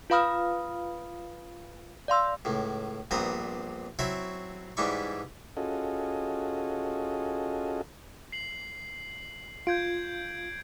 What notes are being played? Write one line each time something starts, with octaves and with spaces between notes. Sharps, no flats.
F4 B4 F5 B5 D#6 F6
D5 F5 C6 E6
C#2 A2
A#1 G2 B3 C4 A#5 D#6
F#3 C4 E4 C#5 E5
G#2 E3 G3 D4 E4 C#6
C#4 F4 F#4 G#4 A4 D#5
C7 F#7
F4 G6 G#6 D7